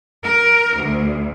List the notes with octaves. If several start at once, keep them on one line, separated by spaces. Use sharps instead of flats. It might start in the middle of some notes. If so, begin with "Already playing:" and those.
A#4
D2